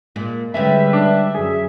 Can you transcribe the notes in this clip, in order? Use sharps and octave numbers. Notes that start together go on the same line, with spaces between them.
A#2 G#3
D3 G3 G#3 C#4 B4 E5
D4
F#2 F#3 G#4